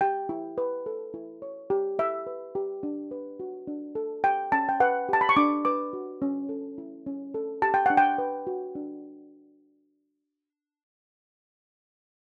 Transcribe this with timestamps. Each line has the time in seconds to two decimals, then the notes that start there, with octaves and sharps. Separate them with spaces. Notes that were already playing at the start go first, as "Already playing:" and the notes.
0.01 G4 G5
0.29 E4
0.58 B4
0.86 A4
1.14 E4
1.42 C#5
1.70 G4
1.99 E4 E5
2.27 B4
2.55 G4
2.83 D4
3.11 B4
3.40 F#4
3.67 D4
3.95 A4
4.24 G4 G5
4.52 C#4 A5
4.69 G5
4.80 B4 F#5
5.09 G4 A5
5.21 B5
5.29 C#6
5.36 D4 D6
5.65 B4 D6
5.93 F#4
6.22 C#4
6.49 A4
6.78 E4
7.06 C#4
7.34 A4
7.62 G4 A5
7.74 G5
7.86 D4 F#5
7.97 G5
8.18 B4
8.47 F#4
8.75 D4